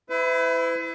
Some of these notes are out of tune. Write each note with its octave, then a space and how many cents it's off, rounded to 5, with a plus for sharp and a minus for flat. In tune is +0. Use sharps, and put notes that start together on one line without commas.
E4 +0 B4 +45